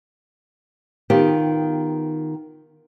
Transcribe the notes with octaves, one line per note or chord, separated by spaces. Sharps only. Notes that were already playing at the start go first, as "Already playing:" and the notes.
D#3 B3 F4 G4